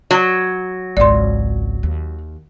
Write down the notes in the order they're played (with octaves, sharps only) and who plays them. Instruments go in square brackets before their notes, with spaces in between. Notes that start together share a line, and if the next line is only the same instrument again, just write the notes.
[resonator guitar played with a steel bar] F#3
[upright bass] G#1 C#2 [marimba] D5 C6
[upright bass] D#2